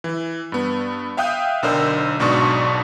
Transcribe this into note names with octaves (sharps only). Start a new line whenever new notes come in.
E3
G2 B3
E5 F5 G5 D#6 F#6 G6
B1 D3 A#4 C5 D#5 E6
B1 G#2 B2 D4 C#6 D#6